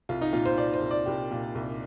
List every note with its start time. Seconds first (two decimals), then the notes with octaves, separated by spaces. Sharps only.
0.09 C2 F4
0.21 D#4
0.33 A#2 F4
0.45 C5
0.57 A#2 D5
0.74 C5
0.82 C2
0.91 D5
1.06 C2 G4
1.31 A#2
1.55 C2